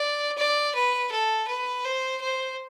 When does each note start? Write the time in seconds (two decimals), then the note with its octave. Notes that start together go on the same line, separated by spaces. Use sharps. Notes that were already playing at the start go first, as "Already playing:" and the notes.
Already playing: D5
0.37 D5
0.75 B4
1.11 A4
1.48 B4
1.84 C5
2.21 C5